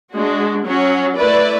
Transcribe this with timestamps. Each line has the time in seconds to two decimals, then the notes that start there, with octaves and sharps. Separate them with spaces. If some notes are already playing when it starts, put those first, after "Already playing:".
0.13 G#3 D4 F#4
0.64 F#3 C#4 F#4 C#5
1.17 A3 E4 B4 D5